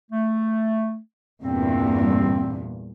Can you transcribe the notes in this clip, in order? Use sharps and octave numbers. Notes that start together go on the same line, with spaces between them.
A3
E2 G2 A#2 C4